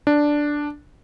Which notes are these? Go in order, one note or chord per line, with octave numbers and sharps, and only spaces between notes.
D4